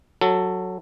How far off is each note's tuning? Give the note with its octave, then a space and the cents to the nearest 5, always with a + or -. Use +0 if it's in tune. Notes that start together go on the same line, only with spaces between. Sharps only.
F#3 +0 A4 +15